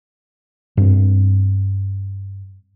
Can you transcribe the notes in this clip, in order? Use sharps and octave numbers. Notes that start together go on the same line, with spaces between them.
G2 B3 C4